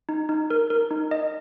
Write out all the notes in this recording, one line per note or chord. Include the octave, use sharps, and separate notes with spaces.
D#4
D#4
A#4
A#4
D#4
D#5